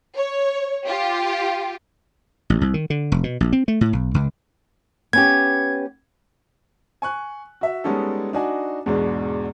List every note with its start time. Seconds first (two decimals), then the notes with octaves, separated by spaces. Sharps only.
0.16 C#5
0.86 F4 G4
2.50 A1
2.61 C2
2.74 D#3
2.90 D3
3.12 F1
3.24 B2
3.41 A#1
3.53 C4
3.68 A3
3.81 A2
3.93 B1
4.14 C#2
5.13 B3 C#4 G4 G#6
7.02 G#5 C#6 F#6
7.61 F#4 E5
7.84 G3 G#3 B3 C#4 D#4 A4
8.33 D4 D#4 F#4 D#5 G#5
8.86 E2 G#2 B2 G#3 D4